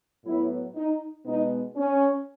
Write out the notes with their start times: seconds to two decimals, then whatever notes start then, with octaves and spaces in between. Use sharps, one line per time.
0.25 A2 F#3 B3 E4
0.75 D#4
1.25 B2 G#3 B3 D#4
1.76 C#4